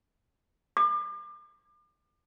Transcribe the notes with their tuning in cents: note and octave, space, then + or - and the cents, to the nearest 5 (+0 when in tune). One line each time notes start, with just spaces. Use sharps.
D6 +40